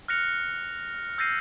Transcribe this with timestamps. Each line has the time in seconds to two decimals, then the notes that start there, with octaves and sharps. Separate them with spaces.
0.08 F6 F#6 A#6 C#7 F7
1.18 E6 G6 A6 A#6 C7 D#7